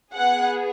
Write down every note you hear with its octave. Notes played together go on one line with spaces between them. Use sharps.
B3 G#4 F#5